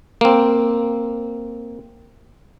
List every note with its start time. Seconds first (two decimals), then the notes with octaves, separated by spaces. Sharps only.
0.21 A#3 C4